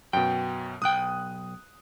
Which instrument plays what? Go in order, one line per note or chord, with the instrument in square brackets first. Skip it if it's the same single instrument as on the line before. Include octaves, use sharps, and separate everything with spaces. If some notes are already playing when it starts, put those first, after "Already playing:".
[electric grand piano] F#2 B2 [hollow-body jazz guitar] G5
[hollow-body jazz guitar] B1 G5 [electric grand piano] D#6 F#6